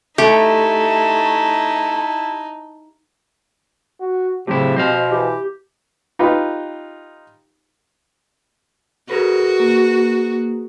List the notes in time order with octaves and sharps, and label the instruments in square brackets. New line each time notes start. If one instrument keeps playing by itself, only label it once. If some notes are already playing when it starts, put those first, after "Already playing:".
[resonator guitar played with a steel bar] A3 [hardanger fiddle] D#4 [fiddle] E4 A5 [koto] G4
[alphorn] F#4
[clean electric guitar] A2 F#3 E4 [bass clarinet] C#3 [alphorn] C4 [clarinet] G4
[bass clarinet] B2 [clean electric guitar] C5 D#5 F5
[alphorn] E3 [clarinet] G4
[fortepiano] D#4 F4 G4 B4
[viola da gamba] F#4 [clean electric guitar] G#4 A#4 B4
[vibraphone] A#3